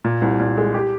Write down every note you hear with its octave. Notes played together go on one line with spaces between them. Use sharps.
A#2
C2
A#2
G#3
G4